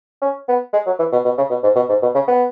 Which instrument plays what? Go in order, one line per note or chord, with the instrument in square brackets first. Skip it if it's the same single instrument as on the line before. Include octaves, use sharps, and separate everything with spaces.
[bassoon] C#4
B3
G#3
F#3
E3
B2
B2
C#3
B2
G#2
B2
G#2
B2
C#3
B3